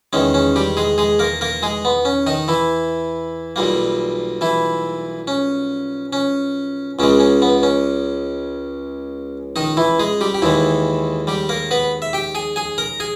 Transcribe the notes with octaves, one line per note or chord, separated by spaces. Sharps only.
E2 D#3 G#3 C#4
C#4
G3 G4
G#3 G#4
G#3 G#4
A#3 A#4
A#3 A#4
G#3 G#4
B3
C#4
D#3 D#4
E3 E4
B1 A#2 G3 A#3
E3 E4
C#4
C#4
C#2 C#3 G#3 C#4
C#4
B3
C#4
D#3 D#4
E3 E4
G#3 G#4
G3 G4
G4
D#2 D#3 E3 G#3 E4
G3 G4
A#3 A#4
B3 B4
E5
G4 G5
G#4 G#5
G#4 G#5
A#4 A#5
G#4 G#5